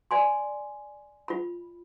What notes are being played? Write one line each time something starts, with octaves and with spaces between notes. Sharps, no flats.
D5 G#5 C6
F4 B5